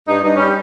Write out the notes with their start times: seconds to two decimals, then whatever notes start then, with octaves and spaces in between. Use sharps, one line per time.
0.08 G2 D#4
0.23 G2 D#4
0.36 G3 C#4